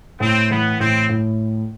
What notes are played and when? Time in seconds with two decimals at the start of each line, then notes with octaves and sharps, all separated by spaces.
0.20 A2 C4
0.50 E3 B3
0.80 A2 C4
1.09 A2